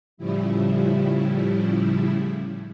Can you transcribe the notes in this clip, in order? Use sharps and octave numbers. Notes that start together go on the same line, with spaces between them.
A2 C#3 F3 G3 E4